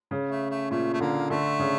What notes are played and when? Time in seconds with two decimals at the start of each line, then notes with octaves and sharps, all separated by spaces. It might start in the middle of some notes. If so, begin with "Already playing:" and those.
0.11 C#3
0.30 A3
0.51 A3
0.71 A#2 A3
0.93 A3
1.00 D3 A#3
1.30 D3 A3
1.59 C#3